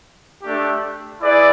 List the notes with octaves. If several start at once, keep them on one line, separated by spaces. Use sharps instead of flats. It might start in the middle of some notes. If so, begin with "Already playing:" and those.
A3 D4 G4
E4 G#4 B4 D5